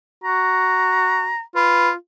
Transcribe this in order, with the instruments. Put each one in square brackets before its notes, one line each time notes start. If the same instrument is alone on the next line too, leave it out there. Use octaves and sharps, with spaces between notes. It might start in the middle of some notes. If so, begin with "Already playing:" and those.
[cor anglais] F#4 [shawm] A#5
[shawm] F4 [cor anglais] B4